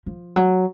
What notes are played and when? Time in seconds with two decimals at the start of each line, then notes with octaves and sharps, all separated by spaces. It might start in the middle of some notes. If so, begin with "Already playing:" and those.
0.06 F3
0.36 F#3